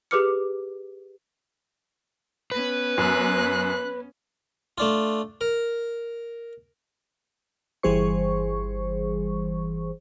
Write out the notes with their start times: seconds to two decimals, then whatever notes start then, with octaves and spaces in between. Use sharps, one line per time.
0.11 G4 G#4 B4 D6 F6 C#7
2.52 B3 C#4 B4
2.98 F#2 F#6
4.78 A3 D4 F4
5.41 A#4
7.83 G1 E3 G3 G#4 C5 C#6